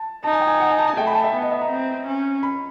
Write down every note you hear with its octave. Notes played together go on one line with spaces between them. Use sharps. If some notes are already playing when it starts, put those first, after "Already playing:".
Already playing: A5
D#4 A5
G#5
G5
G#5
F#5
G#5
A5
G#5
A3 G5
B5
A5
E5
B3
D#5
E5
A#5
C4
C#4
B5